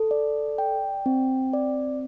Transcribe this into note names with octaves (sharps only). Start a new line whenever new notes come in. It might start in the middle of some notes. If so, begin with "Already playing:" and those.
Already playing: A4
D5
G5
C4
D5